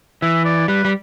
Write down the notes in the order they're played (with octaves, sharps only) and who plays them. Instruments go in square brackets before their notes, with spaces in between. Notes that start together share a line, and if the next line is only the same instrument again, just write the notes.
[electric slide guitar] E3 [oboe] E5
[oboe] D5
[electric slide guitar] G3 [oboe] B4
[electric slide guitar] G3